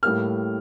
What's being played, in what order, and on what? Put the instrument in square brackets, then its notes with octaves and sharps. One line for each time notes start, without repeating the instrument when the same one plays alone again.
[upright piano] A2 G3 A#3 F6